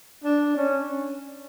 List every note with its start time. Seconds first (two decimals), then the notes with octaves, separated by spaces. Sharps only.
0.24 D4
0.56 C#4